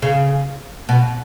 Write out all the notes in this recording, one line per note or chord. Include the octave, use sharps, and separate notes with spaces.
C#3
B2